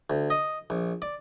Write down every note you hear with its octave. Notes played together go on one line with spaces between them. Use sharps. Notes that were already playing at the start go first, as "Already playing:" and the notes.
D2
D#5
A#1
D5